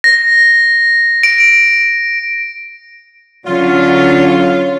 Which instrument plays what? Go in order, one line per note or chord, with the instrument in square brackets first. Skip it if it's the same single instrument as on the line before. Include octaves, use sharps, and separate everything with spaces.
[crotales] A#6
D7
[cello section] D3 F#3 C#4 [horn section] F4 [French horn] C#5